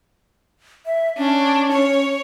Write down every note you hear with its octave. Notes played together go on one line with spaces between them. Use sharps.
E5
C#4 D4
C#5